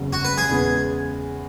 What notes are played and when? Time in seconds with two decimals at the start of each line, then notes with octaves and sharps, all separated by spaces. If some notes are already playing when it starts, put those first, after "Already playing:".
Already playing: F#1 E2 C#3 F#3
0.13 F#4
0.25 B4
0.38 G#4
0.49 E2 C#3 G#3 B3